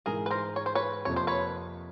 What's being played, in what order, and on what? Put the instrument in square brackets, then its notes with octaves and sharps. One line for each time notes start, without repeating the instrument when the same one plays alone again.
[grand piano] G#2 E3 G#3 [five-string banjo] G#4 A#4
[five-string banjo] B4
A#4 C5
C#5
C5
B4 C#5
[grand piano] F2 C3 F3 A#3 [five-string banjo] C#5
[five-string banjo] C5
B4 C#5